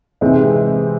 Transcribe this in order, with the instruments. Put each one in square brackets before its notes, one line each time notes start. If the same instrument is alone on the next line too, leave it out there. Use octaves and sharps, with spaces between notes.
[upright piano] C3 E3 G#3 C4 D#4